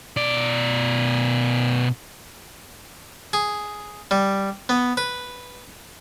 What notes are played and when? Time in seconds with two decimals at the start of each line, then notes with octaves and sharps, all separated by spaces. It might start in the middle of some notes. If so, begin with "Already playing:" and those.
0.17 B2 D5
3.33 G#4
4.11 G3
4.69 B3
4.97 B4